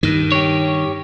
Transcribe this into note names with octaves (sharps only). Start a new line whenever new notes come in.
G2 D#3
G4 C#5